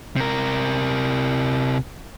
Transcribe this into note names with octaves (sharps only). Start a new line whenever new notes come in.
C3 A#4